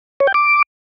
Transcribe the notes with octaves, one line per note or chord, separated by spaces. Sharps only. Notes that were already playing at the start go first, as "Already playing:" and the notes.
C#5
G5
D6